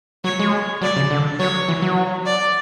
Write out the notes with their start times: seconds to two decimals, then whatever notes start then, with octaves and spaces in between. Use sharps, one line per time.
0.24 F#3 C#5
0.39 G#3
0.82 F#3 D5
0.97 C#3
1.10 D3
1.39 F#3 C#5
1.69 E3
1.82 F#3
2.26 D5